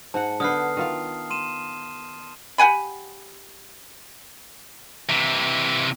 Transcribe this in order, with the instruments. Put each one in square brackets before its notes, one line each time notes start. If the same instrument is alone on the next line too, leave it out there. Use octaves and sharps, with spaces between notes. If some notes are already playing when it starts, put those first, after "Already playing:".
[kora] G#2 F#5 [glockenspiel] A5
[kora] D3 B3 [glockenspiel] D#6 F6 C7
[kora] D#3 F4 F5
[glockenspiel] C6 D#7 E7
[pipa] G4 F#5 G#5 B5
[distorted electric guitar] C3 E3